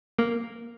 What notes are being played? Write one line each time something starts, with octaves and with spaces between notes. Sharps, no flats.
A#3